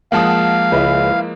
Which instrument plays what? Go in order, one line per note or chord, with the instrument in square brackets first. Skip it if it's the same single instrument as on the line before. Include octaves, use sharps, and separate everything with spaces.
[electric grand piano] F3 G#3 A#3 [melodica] F5 [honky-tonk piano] F#5 A5 D#6
[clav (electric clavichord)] C#2 [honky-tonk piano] E4 B4